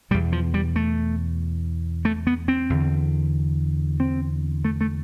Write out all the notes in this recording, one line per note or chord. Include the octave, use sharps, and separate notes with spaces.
E2 B2 G3
F3
G3
A3
A3
B3
C4
E2 D3
C4
A3
A3